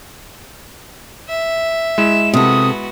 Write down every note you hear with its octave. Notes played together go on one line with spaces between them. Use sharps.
E5
G#3 E4 E7
C3 B3 F#4 A4 D#6